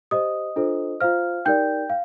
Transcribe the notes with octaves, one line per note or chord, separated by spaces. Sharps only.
G4 C5 D#5 D#6
D4 F4 A4 C5
F4 C5 F5 F6
D#4 G4 A#4 D5 G5 G6
F5